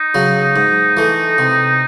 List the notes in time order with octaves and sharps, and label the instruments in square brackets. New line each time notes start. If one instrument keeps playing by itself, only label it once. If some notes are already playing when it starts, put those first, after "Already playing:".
Already playing: [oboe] D#4
[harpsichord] C#3 F#3
G#2
E3 A3
C3